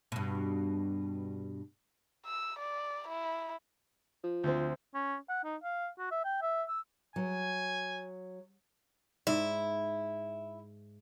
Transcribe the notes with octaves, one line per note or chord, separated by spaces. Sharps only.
G2 B2
E6
D5
E4
F3
D2 C4
C#4
F#5
D#4
F5
F#4
E5
G5
E5
E6
F#3 G#5
G#2 E4 E5